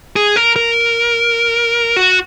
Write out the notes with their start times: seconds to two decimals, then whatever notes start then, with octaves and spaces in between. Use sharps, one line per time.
0.16 G#4
0.36 A#4
0.56 A#4
1.96 F#4